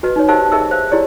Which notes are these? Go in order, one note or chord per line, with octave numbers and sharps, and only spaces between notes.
F#4 B4 D#5
D#4 C#5
G4 A#4 C5 D#5 F5 A5
G#4 A#4 D#5 E5 E6
C5 F5
E4 G4 G#4 C#5 D5